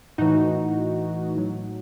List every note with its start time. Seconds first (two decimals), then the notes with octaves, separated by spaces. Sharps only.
0.18 A2 E3 D#4 F#4
1.36 A2 F#3